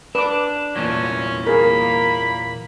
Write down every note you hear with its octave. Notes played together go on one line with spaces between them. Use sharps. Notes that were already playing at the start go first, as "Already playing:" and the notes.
D4 B4 D6
E2 A#2 F#3 C#4
A#3 G#4 A#4 B5